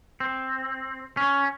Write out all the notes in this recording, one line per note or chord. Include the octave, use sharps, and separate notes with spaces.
C4
C#4